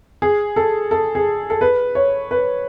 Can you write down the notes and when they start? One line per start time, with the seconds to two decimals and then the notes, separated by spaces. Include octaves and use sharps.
0.22 G#4
0.56 A4
0.91 A4
1.15 G#4
1.50 A4
1.61 B4
1.95 C#5
2.31 B4